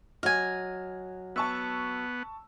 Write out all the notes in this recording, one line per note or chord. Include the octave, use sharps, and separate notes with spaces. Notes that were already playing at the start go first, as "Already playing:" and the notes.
F#3 F#4 D#5 G#5 F6
B3 A5 C#6 E6